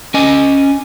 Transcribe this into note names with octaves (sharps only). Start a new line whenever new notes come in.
C#4 D#5 G#5